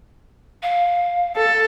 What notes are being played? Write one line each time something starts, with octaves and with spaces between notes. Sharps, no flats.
F5
A4